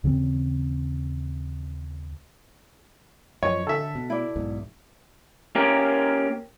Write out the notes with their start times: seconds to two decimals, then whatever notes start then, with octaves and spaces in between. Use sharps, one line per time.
0.04 D#2 C#3 E3 C4
3.43 F#2 F3 C#5 D#5
3.67 D3 A4 E5
3.95 B2
4.10 E4 D5
4.36 B1 E2 G#2
5.55 A#3 C#4 G4 A#4